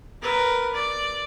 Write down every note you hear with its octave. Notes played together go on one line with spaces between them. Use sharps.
A#4 B4
D5